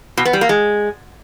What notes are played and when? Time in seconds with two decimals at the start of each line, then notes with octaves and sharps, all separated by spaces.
0.17 B2
0.25 B3
0.33 G3
0.41 A#3
0.49 G#3